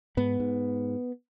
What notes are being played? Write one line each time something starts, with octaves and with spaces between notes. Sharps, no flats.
G#2 B3
G#2